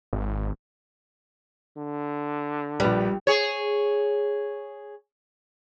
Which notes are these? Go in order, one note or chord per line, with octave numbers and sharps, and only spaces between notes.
G#1
D3
A#1 G3 B4
G#4 C#5